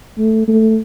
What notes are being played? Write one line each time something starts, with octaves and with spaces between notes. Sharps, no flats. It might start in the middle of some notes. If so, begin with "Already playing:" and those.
A3
A3